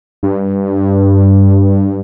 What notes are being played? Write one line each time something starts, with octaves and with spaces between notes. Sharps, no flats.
G2